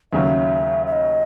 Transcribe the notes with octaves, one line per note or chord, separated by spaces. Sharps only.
D#2 C#3 F#3 C#4 E5
E5
D#5